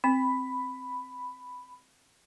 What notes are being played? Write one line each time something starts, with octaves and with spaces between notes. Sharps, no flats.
C4 B5